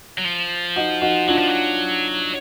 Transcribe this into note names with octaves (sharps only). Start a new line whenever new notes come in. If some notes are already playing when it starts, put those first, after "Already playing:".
F#3
F3
D#4 F#4
D#4 F#4
F#3 D4 F4
F3
F#3